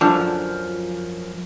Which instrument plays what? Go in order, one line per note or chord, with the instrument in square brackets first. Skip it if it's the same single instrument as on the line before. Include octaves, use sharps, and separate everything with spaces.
[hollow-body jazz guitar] F#2 F3 [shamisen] D3 D4